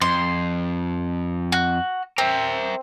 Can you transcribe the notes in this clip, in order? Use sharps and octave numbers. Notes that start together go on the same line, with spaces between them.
F2 C6
F#4
C4 A#4 E5